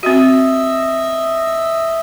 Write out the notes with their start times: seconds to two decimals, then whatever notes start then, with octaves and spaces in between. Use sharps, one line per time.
0.03 C4 F#4 D#5 E5 E6